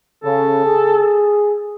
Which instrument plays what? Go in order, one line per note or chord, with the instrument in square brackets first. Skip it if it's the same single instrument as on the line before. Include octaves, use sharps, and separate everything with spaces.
[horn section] C#3 [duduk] A4
[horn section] G#4